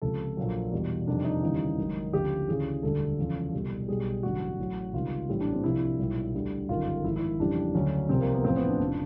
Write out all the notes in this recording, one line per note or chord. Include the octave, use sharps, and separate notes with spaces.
C#2 C3 F3 A4
A#1 A#2 F#3
E2 B2 G3
F2 C3 D#3 G3 D4
D#4
D#2 C#3 E3 G3
G#1 G#2 D#3 F#3
D2 C#3 F3 G4
D2 C#3 E3 G#4
E1 D2 D3 G3 A4
E2 C#3 F3
C2 B2 G3
B1 B2 G3 G#4
A1 G2 D3 F#3 F#4
A1 A2 F#3
C#2 C3 D#3 G3 F4
A#1 A2 E3 G3 E4
D4
C4
C2 C3 F3 E4
B1 A#2 G3
D2 D3 G3
G1 F#2 D#3 G3 F4
G#1 G#2 F3 E4
E4
F2 C#3 E3 G3 D4
D2 C#3 F#3 C#4
C2 C3 F3 C4
A#3
B3
A1 A2 F3 C4
B3
D4
F1 F2 C#3 F3 D4